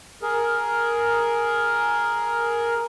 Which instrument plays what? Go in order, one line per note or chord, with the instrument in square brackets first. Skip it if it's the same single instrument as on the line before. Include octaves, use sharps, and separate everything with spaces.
[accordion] G#4 A#4